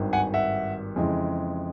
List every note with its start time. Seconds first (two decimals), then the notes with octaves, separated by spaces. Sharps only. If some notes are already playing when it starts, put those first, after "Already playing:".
Already playing: G#1 G2 D#3
0.13 F#5 G#5
0.34 E5 F#5
0.96 F2 C#3 E3 G#3